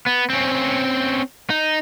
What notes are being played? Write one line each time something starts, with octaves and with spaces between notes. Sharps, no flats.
B3
C4 C#4
D#4